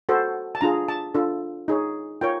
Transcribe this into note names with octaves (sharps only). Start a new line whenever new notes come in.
F#4 A4 C5
A5
D4 F4 G#4 A#5
A5
D4 F4 A4
D#4 G#4 C#5
F4 A#4 C#5 G5